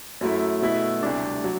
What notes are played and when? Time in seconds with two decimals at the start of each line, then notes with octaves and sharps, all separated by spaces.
0.21 F#2 F#3 A3 E4
0.62 B2 A3 E4
1.03 D2 C3 G3 D4
1.44 F#3